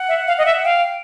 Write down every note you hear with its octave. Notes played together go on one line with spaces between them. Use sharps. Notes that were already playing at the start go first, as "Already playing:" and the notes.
Already playing: F#5
E5
F5
D#5
E5
F5 G5